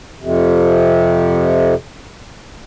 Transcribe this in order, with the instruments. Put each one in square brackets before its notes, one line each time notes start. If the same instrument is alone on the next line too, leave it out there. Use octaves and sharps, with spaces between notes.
[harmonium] F2 C3